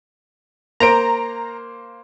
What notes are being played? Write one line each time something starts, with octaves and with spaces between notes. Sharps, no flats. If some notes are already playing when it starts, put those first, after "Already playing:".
A#3 C5 A#5 D7